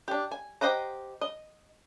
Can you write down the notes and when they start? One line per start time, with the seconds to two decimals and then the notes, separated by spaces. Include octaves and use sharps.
0.08 D4 G4
0.32 G#5
0.61 G4 C5 D#5 F#5 A#5
1.21 D#5